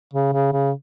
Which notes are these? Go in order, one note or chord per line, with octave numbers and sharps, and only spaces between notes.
C#3
C#3
C#3